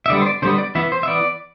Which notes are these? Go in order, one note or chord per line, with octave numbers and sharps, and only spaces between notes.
E5
D3 G3 B3 D5
C5
D5
D3 G3 B3 C5
D5
E3 B3 E5
C5
E5
E3 B3 D5